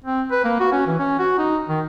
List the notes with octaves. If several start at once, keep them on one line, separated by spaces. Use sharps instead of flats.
C4
B4
A#3
F#4
C#4
E3
C#4
F#4
D#4
D#3